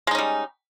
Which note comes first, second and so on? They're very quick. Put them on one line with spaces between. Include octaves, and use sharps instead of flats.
G#3 D#4 C#4 G3